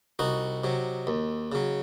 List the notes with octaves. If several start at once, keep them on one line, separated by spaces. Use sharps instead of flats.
C2 D#4 F#4
C3 F#3
D#2
C#3 F#3